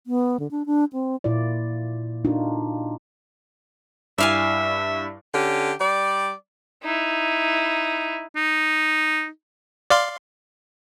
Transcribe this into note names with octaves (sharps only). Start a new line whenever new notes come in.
B3
D3
D4
D4
C4
A#2 E4 F4 D5
D4 D#4 F4 F#4
G2 E4 D5 E5 F5 G#5
D3 C#4 G4
G3 D5
D#4 E4
D#4
D5 F5 C6